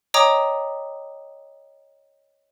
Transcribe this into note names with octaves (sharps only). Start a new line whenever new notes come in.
C#5 D#5 G5 A#5 D6 D#6